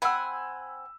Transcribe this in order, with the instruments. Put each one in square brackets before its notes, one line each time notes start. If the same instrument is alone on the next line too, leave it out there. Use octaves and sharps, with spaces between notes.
[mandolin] C4 F#5 G#5 [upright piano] B5 E6